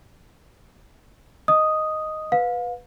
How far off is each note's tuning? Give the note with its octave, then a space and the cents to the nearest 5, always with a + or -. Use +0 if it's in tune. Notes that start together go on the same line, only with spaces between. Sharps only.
D#5 +0 D#6 +0
B4 +0 F5 +35